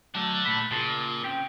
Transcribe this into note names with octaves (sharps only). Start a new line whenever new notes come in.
F#3 A3 D4 A4
A#2 A3 B5
A#2 C#3 G#4 A5
C4 C#4 G5